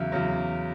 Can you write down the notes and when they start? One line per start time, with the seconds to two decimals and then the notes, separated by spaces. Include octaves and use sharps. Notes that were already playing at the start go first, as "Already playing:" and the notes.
Already playing: E2 C#3 F#3 E5
0.12 E2 C#3 F#3